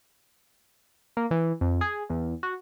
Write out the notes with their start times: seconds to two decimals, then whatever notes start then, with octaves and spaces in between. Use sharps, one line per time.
1.17 A#3
1.31 E3
1.61 F2
1.81 G#4
2.09 E2
2.43 F#4